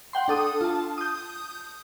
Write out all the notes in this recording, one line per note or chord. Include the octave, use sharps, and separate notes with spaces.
F#5 G5 C6
D4 A4 D#6
F4 A5
D#6 G6